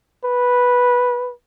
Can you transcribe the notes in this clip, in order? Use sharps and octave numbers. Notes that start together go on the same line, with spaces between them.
B4